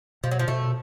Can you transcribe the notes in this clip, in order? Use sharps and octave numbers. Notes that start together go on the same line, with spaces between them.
B2 F3
F#3
F3
B2 A3